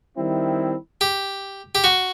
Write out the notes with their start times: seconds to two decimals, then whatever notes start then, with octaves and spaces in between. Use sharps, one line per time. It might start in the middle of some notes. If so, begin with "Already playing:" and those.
0.17 D#3 G3 C4 E4
1.01 G4
1.75 G4
1.84 F#4